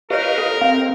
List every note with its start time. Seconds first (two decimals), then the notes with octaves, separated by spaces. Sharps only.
0.10 G4 A#4 B4 C#5 D#5 F5
0.38 A4
0.61 C4 F5